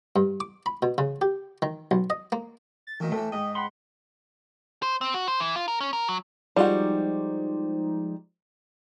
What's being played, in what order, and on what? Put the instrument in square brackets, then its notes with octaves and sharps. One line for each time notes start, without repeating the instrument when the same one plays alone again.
[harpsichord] G2
D6
B5
B2
C#3
G4
D#3
B1
D#5
A#3
[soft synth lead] A6
[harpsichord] D2 A#2 D#3 [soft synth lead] E3
[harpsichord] A2 E3 [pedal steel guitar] A3 [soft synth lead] G5
[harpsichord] G#2 [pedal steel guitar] D#5
[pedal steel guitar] F#5 B5 C6
[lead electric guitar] C5
C4
F#4
C5
E3
F4
A#4
C#4
A#4
F#3
[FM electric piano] F3 G#3 C5 [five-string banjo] G3 F#4 [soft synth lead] D#4